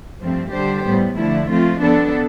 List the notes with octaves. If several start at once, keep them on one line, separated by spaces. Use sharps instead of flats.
G2 F3 A3 C4
D3 G3 D4 G4 C5
A2 G3 B3
D3 F3 A3 E4
F3 A3 C4 F4
D3 F3 B3 D4 A4